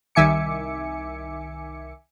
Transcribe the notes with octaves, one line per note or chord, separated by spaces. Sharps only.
C2 D#3 E5 G#5 D6 C#7